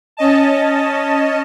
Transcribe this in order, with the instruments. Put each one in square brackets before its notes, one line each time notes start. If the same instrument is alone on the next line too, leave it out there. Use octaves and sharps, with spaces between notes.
[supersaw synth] C#4 D#5 A5